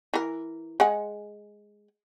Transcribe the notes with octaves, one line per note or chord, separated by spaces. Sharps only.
E3 A#4
G#3 F#5 G#5